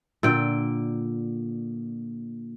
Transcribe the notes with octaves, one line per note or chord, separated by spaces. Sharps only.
A#2 D3 G5